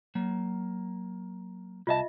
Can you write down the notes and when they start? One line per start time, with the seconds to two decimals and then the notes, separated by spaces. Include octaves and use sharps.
0.15 F#3 A#3
1.87 C2 F4 D#5 E5 A5